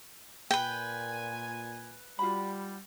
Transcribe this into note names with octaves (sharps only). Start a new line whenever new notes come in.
A#2 B4 G5 G#5
G3 F4 F#4 B5